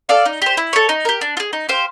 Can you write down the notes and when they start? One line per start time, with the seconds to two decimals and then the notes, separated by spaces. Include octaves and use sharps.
0.09 A4 D5 F5
0.26 D#4
0.42 G4 C5
0.57 E4
0.73 A4 C#5
0.89 D#4
1.05 G4 A#4
1.21 D4
1.37 F4
1.40 G#4
1.53 D#4
1.69 G4 C5 F5